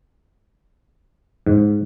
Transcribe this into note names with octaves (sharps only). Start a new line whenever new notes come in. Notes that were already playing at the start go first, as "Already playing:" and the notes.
G#2